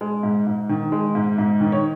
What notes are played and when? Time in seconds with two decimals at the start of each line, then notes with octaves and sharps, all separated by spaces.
0.01 G#3
0.23 G#2
0.47 G#2
0.69 D#3
0.92 G#3
1.15 G#2
1.38 G#2
1.61 D#3
1.72 C#5